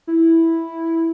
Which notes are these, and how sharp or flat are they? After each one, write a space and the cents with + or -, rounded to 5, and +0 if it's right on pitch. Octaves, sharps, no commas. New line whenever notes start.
E4 -5